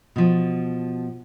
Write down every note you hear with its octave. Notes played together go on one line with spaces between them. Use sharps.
B2 F3